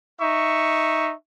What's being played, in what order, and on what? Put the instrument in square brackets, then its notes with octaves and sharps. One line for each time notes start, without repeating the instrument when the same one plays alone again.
[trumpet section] D#4 E5 C#6